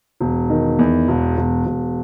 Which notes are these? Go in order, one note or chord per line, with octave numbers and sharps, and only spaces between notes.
E1
D#3
E2
E1
E1
E1